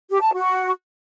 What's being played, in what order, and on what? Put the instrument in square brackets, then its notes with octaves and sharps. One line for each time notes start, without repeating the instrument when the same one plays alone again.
[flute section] G4
A5
F#4